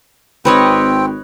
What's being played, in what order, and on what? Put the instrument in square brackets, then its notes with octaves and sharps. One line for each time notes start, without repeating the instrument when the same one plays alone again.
[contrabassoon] G#1 [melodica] C4 G5 [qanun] B4 C#5 D#5